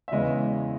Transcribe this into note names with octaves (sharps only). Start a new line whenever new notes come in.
E5
E2 C#3 E3 G#3 B3 D#5